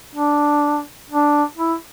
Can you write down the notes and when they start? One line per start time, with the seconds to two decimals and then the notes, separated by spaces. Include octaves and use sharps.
0.15 D4
1.10 D4
1.57 E4